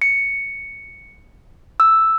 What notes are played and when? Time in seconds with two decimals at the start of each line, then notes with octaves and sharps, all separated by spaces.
0.02 C#7
1.80 E6